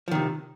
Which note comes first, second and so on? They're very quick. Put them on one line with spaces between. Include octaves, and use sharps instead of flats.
F3 D#3 C3